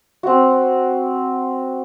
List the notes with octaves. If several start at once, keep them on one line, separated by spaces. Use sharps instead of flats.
C4 F#4